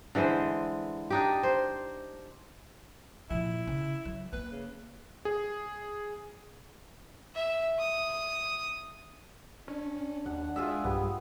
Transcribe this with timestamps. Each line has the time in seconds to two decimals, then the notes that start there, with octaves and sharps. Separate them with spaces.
0.15 D3 E3 G#3 C5
1.10 D4 D#4 G4
1.43 C5
3.30 A#2 F3 E4
3.67 C#3
4.05 F#3
4.33 A#3 B4
4.52 C#3
5.25 G#4
7.35 E5
7.79 D#6
9.68 C#4 D4
10.26 D#2 F#5
10.56 G#3 F4 G#4 E5
10.84 B1 G2 B3 G4